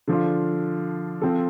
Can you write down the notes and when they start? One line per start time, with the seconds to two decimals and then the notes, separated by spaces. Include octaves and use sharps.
0.08 D3 F3 D4 F4
1.22 F3 C4 A4